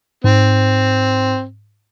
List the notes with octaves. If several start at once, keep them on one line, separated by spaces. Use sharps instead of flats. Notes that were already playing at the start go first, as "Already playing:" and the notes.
G#2 C4